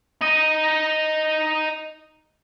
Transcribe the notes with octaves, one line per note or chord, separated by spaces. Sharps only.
D#4 D#5